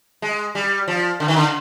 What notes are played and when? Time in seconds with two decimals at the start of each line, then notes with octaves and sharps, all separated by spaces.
0.22 G#3
0.55 G3
0.88 F3
1.20 D3
1.28 D#3
1.36 D3